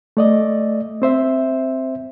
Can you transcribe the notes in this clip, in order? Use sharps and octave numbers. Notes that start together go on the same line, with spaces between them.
A3 D5 D#5
C4 C5 E5